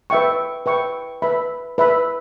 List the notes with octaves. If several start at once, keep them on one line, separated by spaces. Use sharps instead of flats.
B4 E5 G5 C#6
B4 E5 G5 C#6
B4 E5 B5
B4 E5 B5